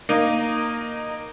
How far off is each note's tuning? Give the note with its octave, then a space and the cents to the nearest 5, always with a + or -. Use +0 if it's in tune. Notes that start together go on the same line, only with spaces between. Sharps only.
A#3 +0 D#4 -15